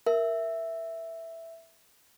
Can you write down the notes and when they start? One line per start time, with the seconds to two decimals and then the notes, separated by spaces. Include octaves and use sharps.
0.06 A#4 E5